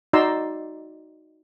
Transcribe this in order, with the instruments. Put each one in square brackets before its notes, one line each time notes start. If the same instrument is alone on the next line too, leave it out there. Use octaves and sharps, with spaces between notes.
[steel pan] D#4 F#4 D5 A#5 C6 E6